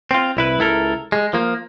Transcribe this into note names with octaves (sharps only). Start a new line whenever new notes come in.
C4 F4
C2 E4 B4
C#2 E4 A4 A#4
G#3
F3 A#3